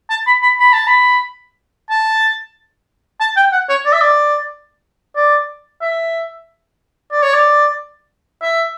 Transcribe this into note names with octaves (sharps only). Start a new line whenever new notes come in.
A5
B5
B5
B5
A5
B5
A5
A5
G5
F#5
C#5
D5
E5
D5
D5
E5
D5
C#5
D5
E5